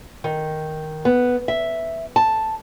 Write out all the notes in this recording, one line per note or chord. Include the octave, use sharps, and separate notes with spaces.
D#3
B3
E5
A5